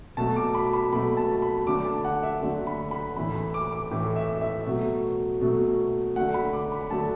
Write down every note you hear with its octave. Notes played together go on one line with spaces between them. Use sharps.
B2 F#3 A3 A5
D6
B5
B5
B2 F#3 A3 B5
A5
B5
D3 F#3 A3 D6
A5
F#5
E5
D3 F#3 A3
B5
B5
A2 E3 A3 B5
B5
D6
D6
A2 E3 A3
E5
E5
B2 F#3 A3
B2 F#3 A3
D3 F#3 A3 F#5
B5
D6
B5
D3 F#3 A3 A5